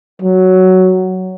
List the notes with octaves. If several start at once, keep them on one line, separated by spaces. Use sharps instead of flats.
F#3